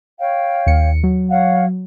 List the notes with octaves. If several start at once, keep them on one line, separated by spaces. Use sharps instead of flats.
C#5 F5 G5
D#2 C#7
F#3
C#5 F5 F#5